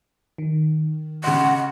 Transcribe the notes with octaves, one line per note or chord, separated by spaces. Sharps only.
D#3
C#3 D#5 F#5 C6